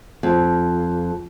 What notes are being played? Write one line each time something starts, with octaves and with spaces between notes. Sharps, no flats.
F2